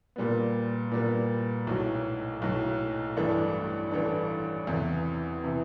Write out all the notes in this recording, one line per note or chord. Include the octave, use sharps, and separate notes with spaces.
A#2 G3 B3
A#2 G3 B3
B1 A2 F#3
B1 A2 F#3
A1 G2 E3 A3 D4
A1 G2 E3 A3 D4
E2 C3 E3
C3 E3